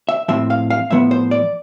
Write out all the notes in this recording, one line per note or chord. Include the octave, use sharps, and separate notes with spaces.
E5
A2 F3 C4 E5
F5
F5
A2 F3 B3 E5
C5
D5